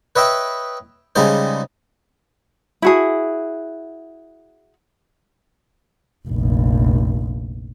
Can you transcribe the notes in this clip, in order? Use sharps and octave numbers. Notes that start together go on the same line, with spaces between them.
B4 C#5 D#5 E5 G5
C#3 G3 G#3 D#4 C5
E4 F#4 G#4
F1 A#1